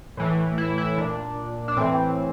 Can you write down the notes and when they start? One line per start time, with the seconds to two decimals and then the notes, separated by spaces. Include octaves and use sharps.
0.17 A2 E3
0.58 E4
0.78 E4
0.98 A#2 D4
1.68 D4
1.77 A2 E3 C4